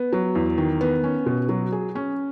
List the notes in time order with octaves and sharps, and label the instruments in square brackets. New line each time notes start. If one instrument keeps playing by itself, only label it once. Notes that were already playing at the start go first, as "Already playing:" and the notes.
Already playing: [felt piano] B3
F#3
E2
D#3
B3
C#4
B2
F#3
G#4
C#4